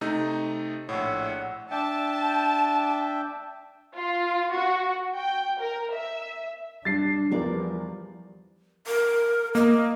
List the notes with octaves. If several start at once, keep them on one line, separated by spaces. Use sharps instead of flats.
C3 A3 D#4
A#1 A2 C#5 F#5 E6
D4 E5 G5 A5
F4
F#4
G5
A#4
E5
G3 D4 A6 C7
E2 E3 F3 G3 A#4 D5
A#4
A#3 D#5